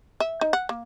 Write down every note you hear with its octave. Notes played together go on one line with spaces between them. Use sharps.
E5
D#4
F#5
A#3